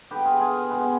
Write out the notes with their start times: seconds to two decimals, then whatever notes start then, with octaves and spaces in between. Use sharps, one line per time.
0.11 D3 G3 B3 G4 B4
0.25 F4 G#4
0.40 F4 G#4
0.70 B2 G#3 B3